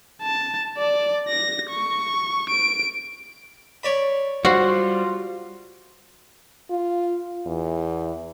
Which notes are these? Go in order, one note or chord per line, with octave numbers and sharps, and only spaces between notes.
A5
D5
A#6
C#6
D7
C#5 D5 B5
G3 F4 F#4 C5
F4
E2